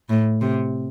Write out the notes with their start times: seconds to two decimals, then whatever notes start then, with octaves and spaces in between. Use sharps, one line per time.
0.09 A2
0.41 C3